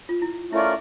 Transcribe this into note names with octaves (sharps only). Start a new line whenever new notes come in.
F4
E4
A3 C#4 E4 F4 A#4 D5